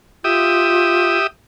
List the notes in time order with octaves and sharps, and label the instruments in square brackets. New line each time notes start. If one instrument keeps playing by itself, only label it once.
[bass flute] F4 [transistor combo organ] G4 E5 D#6